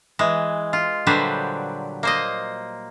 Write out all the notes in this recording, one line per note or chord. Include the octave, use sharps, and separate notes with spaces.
E3 G#3
F4
A#2 D3 F#3 G3 B4 C5
A#3 C5 D#5